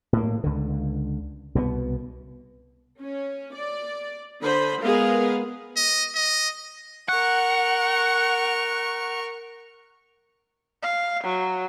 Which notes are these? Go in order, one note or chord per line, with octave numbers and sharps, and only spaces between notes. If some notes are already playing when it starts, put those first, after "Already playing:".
A2 A#3
C#2 D3
C2 B2 D#3 B3
C#4
D5
D3 C5 B5
G#3 B3 G#4 A#4 F5
D#5
D#5
A#4 F#5 C#6
F5
F#3